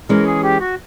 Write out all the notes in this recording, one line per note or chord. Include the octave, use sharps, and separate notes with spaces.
E3 G#3 C#4 A#4
G#4
G4
F#4